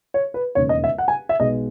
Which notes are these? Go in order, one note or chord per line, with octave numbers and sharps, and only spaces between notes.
C#5
B4
E1 D#2 C#3 C#5
D#5
E5
F#5
G#5
E5
B1 B2 G#3 D#5